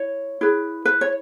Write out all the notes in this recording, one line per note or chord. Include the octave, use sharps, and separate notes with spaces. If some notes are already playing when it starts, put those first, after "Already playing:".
Already playing: E4 C#5
E4 G#4 B4
B4
C#5